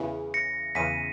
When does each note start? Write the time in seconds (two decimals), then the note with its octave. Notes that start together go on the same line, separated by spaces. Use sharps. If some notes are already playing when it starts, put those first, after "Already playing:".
Already playing: E2 C#3 E3
0.34 A#6 C#7
0.75 E2 C#3 E3 B6 D#7